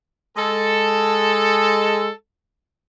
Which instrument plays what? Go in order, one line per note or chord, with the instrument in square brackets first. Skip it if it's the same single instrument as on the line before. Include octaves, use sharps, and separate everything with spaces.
[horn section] G#3 A4